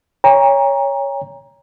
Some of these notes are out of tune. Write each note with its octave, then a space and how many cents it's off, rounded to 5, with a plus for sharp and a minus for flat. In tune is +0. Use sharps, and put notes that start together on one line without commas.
C#5 +10 G5 +45 A#5 +10